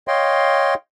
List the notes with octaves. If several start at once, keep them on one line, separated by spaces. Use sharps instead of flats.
C#5 D#5 F5 G5 C6